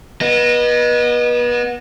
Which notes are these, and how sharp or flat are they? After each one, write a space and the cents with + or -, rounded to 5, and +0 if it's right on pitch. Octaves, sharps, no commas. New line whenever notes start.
B3 -30 D#5 -15